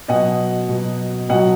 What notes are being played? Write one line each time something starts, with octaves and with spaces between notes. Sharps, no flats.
B2 F#3 D#5 F#5
B2 F#3
B2 F#3 D#5 F#5